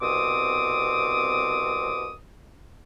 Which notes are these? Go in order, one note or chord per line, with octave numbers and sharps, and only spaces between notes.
C2 B2 C4 D6 D#6